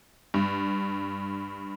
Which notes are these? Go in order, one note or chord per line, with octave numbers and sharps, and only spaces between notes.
G2